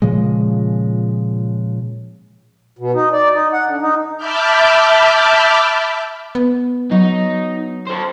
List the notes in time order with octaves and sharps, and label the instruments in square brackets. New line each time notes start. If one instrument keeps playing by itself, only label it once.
[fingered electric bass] A#2 C#3 F3 G#3
[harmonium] B2
D#4
D5
D#4
F#5
D3
D#4
[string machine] E5 A5 B5 D6 F6 G6
[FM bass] B3
[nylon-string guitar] F#3 F#5 [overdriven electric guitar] D#4
[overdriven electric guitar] A4 C5